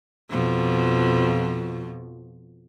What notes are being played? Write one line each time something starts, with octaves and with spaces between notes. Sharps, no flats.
F2 B2 F3